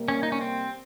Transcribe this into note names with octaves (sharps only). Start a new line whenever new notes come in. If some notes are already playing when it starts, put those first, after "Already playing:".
Already playing: C3 G3 A#3
C#4
D#4
C#4
C4